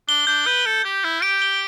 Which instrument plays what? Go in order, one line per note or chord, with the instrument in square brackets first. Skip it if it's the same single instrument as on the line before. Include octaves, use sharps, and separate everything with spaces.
[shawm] D4 [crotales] G7
[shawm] D4 [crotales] G6
[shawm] B4 [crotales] G6
[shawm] A4 [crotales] G7
[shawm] G4 [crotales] G6
[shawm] E4 [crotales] G6
[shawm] G4 [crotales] D7
[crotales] G7